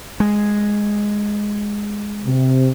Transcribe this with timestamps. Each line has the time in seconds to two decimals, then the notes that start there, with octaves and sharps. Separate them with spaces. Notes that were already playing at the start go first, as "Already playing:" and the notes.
0.20 G#3
2.26 C3